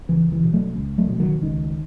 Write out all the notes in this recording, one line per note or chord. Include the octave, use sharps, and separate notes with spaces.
C#2 E3
E3
B2
F#3 A3
C#2
F#3 A3
B2
D#3 F#3
C#2 D#3